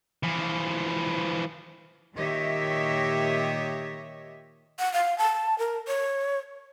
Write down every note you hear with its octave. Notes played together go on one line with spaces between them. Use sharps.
E3 F3
A#2 D#3 G4 C#5 D#5 E5
F#5
F5
A5
A#4
C#5